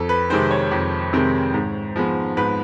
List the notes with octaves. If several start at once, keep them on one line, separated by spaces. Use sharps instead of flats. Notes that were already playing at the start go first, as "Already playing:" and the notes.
Already playing: F2 A4
B4
C3 D#3 G#3 C4 C5
C#5
F2
C3 D#3 G#3 C4
G#2
F3 G#3 B3
G#2 B4